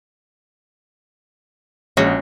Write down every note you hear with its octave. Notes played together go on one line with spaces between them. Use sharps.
A#1 G#3 C#4 F#4